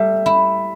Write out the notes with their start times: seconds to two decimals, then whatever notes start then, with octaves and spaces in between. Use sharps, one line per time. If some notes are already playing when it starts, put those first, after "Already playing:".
Already playing: G3 A4 E5
0.26 E4